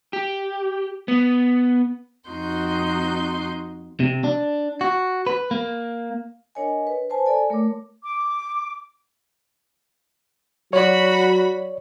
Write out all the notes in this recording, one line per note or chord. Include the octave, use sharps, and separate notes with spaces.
G4
B3
F2 C4 D#4 F#4 C6 G6
C3
D4
F#4
B4
A#3
D4 A#4 C#5 D#5 G#5
B4
B4 C5 G#5 A5
A4 D5 G#5
A3 A#4 C#5 D6
D6
F#3 F#4 C#5 D5 B5